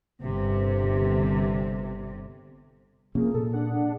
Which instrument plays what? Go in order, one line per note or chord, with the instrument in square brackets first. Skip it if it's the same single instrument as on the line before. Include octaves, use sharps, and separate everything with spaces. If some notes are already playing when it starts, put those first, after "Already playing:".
[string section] G1 C3
[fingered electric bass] C3 F3 C#4 [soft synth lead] A#3 [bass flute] G#4
[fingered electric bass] A#2 [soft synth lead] A4
[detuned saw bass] D4 [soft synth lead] F#5